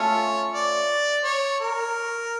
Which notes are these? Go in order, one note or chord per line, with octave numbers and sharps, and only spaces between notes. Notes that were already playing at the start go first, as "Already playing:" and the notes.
Already playing: A3 C#4 F4 A4 C#5
D5
C#5
A#4